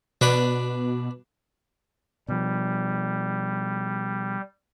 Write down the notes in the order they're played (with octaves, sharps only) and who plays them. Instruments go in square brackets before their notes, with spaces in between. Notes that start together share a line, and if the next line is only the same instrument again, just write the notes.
[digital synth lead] B2 [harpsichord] D4 B4 D5
[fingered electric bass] B2 F3 [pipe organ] G3